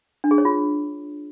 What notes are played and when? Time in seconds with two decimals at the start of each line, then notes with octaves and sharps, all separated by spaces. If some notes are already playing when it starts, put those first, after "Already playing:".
0.24 D4
0.31 G#4
0.38 C#5
0.45 F4